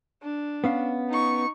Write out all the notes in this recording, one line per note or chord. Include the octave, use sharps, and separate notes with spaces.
D4
B3 C#4 F5
D#4 C#6